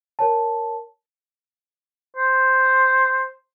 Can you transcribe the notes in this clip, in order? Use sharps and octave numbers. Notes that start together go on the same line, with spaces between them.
A#4 C#5 A5
C5